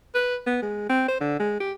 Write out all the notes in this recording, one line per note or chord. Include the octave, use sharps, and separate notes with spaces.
B4
B3
G#3
C4
C5
D3
G#3
G4